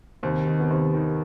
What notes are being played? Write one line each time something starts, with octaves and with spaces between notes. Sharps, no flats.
D#2 C3 C4
D#3
B3
D#2 C3 C4
D#3